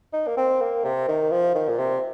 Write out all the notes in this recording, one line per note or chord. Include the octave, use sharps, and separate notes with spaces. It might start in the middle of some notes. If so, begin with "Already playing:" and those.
D#4
A#3
C4
A#3
C3
D#3
F3
D#3
A#2
C3